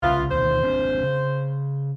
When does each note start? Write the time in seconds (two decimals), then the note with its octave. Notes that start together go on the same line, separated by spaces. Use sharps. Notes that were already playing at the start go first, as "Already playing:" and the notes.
0.03 C2 C#3 B3 E4 F4
0.31 D2 B2 D#3 C5
0.62 G#1 C4 D4
1.03 C#3